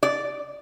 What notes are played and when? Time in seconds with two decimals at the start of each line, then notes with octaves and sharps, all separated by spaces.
0.03 D5